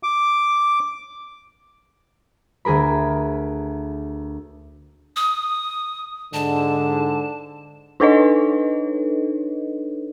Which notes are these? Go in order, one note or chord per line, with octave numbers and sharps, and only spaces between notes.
D6
D2 G#4 A#4 B5
D#6
G#2 D3 A5
D4 D#4 A4 B4 C#5 D#5